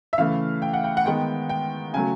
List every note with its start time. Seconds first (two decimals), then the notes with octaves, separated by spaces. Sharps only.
0.13 E5
0.18 C#3 E3 A3 F5
0.62 G5
0.73 F#5
0.84 G5
0.97 F#5
1.05 D#3 G#3 B3 G5
1.49 G5
1.93 C#3 F#3 A3 G#5